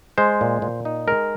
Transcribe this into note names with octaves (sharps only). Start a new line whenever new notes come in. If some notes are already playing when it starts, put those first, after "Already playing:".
G#3 C5
A#2
A#2
D#4
G#3 A#4